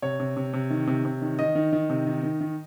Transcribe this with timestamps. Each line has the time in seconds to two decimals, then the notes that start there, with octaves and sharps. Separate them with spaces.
0.02 C3 C#5
0.19 C3
0.37 C3
0.53 C3
0.70 D#3
0.87 C3
1.05 C3
1.22 D#3
1.39 D#3 D#5
1.55 D#3
1.72 D#3
1.90 C3
2.07 D#3
2.23 D#3
2.41 D#3